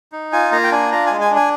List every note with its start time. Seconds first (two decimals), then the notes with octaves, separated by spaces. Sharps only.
0.12 D#4
0.33 F4 G#5
0.52 A#3 A#5
0.64 G5
0.72 D4 G#5
0.92 F4 A#5
1.07 G#3 G#5
1.21 G#5
1.31 D4
1.36 G#5